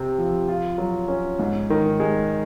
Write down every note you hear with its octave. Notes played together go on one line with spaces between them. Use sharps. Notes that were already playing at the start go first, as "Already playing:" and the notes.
Already playing: C3 C4
F3
F4
F#3
C#4
G#2
D#3
G#3